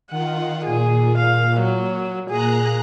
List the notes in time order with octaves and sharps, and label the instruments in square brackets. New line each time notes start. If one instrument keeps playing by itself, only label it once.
[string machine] D#3 F4 [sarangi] F#5
[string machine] A#2 [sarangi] G#4
[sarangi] F5
F#3
[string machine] A#2 A#5 F#6 [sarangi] G#4